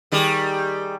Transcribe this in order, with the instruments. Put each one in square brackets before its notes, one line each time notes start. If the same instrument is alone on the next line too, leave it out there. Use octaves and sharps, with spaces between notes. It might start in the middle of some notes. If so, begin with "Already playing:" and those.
[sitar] D#3 G3 G#4